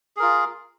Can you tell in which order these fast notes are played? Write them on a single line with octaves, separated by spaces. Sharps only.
G#4 A#4 F4